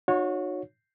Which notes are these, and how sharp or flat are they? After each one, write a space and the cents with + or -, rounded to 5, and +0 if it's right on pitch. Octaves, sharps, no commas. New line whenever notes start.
D#4 -35 F#4 -30 C#5 +0